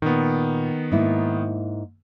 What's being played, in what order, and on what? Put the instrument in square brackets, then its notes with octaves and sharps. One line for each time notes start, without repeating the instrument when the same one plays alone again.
[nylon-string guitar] A#2 [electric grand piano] D#3 B3
[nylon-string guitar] G#2 A#3 E4